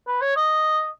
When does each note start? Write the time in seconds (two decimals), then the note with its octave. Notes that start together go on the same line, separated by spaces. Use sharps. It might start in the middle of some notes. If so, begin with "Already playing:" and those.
0.07 B4
0.22 C#5
0.36 D#5